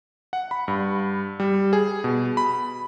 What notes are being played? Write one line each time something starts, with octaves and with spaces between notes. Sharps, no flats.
F#5
B5
G2
G3
G#4
B2
B5